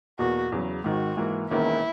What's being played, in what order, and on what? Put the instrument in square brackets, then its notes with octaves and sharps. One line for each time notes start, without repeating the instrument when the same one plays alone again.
[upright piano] E2 B2 A#3 [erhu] F#4
[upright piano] E2 C#3 F#3
[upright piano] G#1 G#2 D#3 [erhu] F#4
[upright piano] G#2 E3 A#3
[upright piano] E1 E2 D#3 A#3 C#4 [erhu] E4